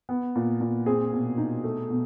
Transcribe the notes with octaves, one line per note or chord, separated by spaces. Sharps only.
B3
A#2
A#2
C4 G#4
B2
D#4
A3
B2